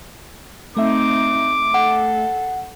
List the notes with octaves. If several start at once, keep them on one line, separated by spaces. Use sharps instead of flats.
A3 C4 D#4 E5 D6
A4 F#5